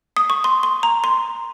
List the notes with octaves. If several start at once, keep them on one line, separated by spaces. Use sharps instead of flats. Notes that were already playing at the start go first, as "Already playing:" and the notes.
D#6
C#6
C6
C6
A#5
C6